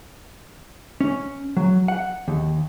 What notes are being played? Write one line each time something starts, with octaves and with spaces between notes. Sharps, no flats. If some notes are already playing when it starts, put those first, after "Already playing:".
C#4
F#3
F#5
D#2